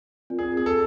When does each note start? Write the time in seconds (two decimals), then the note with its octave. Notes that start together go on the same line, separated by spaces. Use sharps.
0.30 C4 F4 A#4 D5
0.39 G#4
0.57 G#4
0.66 A4